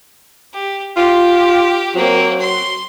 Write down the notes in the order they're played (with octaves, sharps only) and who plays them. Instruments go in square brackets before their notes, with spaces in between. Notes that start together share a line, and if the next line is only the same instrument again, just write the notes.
[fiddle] G4
[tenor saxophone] F4 [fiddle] G4
[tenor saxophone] F#3 [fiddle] A#3 C4
[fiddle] C6